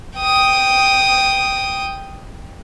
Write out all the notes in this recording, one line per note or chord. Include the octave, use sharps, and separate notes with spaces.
G5 D#6